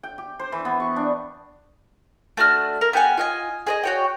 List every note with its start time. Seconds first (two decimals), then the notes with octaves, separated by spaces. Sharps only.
0.03 G5
0.18 G4
0.39 C5
0.52 E3
0.65 B3
0.80 C#6
0.96 D4
2.37 A3 D4 F#4 F6
2.81 A#4
2.93 B3 G4 F#5 G#5
3.17 F4 D#5 G#5
3.67 G#4 B4 D#5
3.83 F#4 C#5 G5